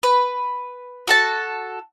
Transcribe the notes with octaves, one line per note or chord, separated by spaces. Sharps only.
B4
F#4 A4 A5